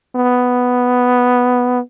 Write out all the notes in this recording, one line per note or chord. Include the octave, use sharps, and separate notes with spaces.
B3